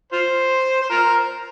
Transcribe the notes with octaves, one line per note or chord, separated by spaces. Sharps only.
F4 C5
C5
F4 A#4